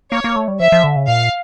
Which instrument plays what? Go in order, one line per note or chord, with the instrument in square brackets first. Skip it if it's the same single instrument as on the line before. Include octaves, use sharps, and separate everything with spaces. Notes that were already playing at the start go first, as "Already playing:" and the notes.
[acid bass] A#3 [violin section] C#5
[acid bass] A#3
A3
G3
[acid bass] F3 [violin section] E5
[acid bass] F3
D3
C#3
[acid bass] A#2 [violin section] F5